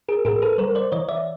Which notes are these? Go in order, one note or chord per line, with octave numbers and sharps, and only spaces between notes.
G#4 A#4
A2 G#4 A#4
A4 B4
G3 A#4 C5
C5 D5
E3 C#5 D#5
D5 E5